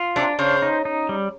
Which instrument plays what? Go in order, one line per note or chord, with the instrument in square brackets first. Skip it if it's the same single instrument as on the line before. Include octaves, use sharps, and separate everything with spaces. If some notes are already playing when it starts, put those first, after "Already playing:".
Already playing: [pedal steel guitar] F4
[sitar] C3 [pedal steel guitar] D4
[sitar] C#3 [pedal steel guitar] C5
[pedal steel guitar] D#4
D#4
G3